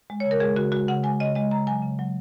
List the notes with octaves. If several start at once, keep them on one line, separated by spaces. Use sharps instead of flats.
G#3
C#3 C#5
A#4
G#3 G#4
C#3 F#4
G#3 F#4
C#3 F#5
G#3 G#5
C#3 D#5
G#3 D#5
C#3 A#5
F#3 G#5
C#3
F#3